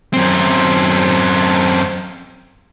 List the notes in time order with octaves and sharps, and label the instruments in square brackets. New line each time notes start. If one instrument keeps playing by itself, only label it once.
[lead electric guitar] F#2 C4